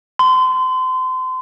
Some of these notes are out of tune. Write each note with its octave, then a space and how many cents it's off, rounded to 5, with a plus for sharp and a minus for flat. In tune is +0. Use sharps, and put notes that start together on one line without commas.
C6 -30